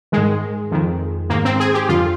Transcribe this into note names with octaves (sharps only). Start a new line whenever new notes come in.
G#2 D#3 G#3
F2 D#3
G#2 D#3 A#3
C4
G#4
G4
F2 D3 F4